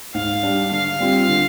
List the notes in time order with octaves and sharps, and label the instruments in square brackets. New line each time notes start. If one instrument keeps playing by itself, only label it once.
[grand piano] G#2 [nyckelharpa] F5
[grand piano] G3 D4
[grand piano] D3 [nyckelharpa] F5
[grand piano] G3 C4 F4
D3